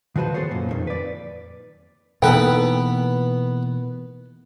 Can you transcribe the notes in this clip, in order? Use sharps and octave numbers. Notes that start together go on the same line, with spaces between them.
D#3 F3 F#4 B4 C5
B3 G#4 A4 C5 C#5
F#2 A#2
F2 G#2 D#3
B4 D5
B2 E3 A#3 B3 D#4 A4 B4 G5